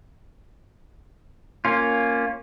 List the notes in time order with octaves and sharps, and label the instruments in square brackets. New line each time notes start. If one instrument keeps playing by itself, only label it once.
[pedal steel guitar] A#3 C#4 F4